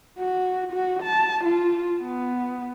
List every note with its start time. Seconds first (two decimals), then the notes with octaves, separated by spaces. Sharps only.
0.19 F#4
0.72 F#4
1.03 A5
1.44 F4
2.03 B3